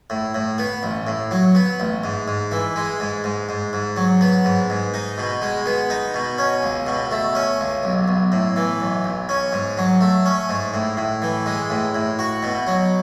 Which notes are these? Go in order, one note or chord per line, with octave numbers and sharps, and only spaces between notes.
A2
A2
B3
A1
A2
F#3
B3
A1
G#2
G#2
E3
G#3
G#2
G#2
G#2
G#2
F#3
B3
G#2
G#2
D#4
B2
G#3
B3
D#4
B2
C#4
C#2
B2
A3
C#4
C#2
B1
B1
A2
E3
B1
B1
C#4
G#2
F#3
A3
C#4
G#2
A2
A2
E3
G#3
A2
A2
F#4
B2
F#3